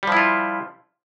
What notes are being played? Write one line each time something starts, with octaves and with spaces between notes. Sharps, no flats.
F3 G3 E4 F4